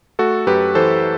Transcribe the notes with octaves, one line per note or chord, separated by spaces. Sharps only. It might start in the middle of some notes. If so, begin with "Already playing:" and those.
A3 F#4 A4
F#2 G4 B4
E3 A4 C5